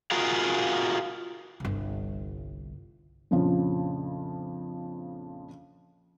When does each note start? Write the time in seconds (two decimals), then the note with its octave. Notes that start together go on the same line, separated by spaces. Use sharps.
0.11 F4 F#4 G#4 A#4 F5
1.60 G1 C2
3.31 A#1 F2 C#3 F3